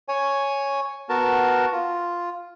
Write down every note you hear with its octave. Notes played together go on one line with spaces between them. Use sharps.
C#5 G#5
B3 F#4 A#4 A5
F4